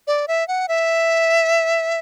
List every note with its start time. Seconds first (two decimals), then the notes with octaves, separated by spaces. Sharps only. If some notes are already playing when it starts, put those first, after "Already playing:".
0.07 D5
0.28 E5
0.48 F#5
0.68 E5